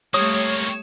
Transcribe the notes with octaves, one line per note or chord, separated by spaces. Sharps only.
G3 A3 A#3 C4 C#5 D#6